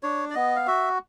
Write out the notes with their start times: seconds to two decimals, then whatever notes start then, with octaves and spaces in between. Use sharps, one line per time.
0.03 D4 C#5
0.30 D5
0.35 B3 D#5
0.56 F5
0.67 F#4 E5